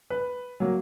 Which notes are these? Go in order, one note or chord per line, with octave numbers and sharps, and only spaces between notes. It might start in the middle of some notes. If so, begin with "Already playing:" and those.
B4
F#3 A#3